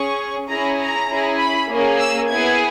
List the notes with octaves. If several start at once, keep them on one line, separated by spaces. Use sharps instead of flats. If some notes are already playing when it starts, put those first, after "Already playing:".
Already playing: C#4 G#4 C#6
C#4 E4 G#4 A#5
A#5
C#4 E4 G#4
B5
A#3 C#4 G#4
E6
B3 E4 G#4 G#6